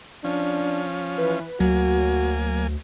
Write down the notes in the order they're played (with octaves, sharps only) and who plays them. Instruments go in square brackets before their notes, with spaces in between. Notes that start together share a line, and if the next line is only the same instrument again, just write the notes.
[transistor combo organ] F3 C#4 [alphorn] D4
[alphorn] E3 [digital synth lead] B4
[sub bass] D2 [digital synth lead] F#3 [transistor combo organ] A#3 G#5 [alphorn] F#4